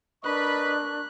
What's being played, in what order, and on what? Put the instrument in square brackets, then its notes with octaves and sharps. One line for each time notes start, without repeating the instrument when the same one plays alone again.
[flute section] D4 A#4 C#6 [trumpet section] B4 D#5 B5 [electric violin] F#6